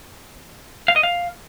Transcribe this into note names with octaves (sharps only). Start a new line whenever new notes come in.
F5
D#5
F5